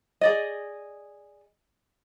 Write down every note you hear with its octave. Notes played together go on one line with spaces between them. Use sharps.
G#4 D5 D#5